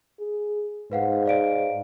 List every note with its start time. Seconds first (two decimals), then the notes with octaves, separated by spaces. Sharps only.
0.20 G#4
0.92 G#2 B4 F5 F#5
1.26 D5 F5 D7